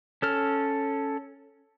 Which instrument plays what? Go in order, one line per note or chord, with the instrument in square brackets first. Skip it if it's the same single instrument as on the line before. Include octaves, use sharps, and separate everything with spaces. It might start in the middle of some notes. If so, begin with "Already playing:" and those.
[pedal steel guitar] C#4 A4 F6